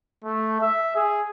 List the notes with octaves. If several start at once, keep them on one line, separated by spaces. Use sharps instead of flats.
A3
E5
G#4